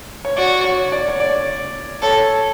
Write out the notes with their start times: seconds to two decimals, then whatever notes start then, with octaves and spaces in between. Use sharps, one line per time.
0.25 C#5
0.37 F#4 D5
0.64 C#5
0.92 D5
1.08 C#5
1.20 D5
2.02 A4 C#5